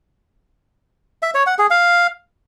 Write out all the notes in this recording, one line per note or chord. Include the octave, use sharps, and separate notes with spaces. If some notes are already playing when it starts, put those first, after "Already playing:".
E5
C#5
F#5
G#4
F5